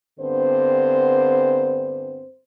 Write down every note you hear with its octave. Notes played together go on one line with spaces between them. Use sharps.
G2 D3 B3 C4 C5